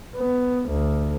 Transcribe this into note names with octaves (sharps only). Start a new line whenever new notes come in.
B3
D2